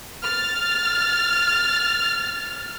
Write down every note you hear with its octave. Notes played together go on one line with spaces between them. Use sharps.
F6 A6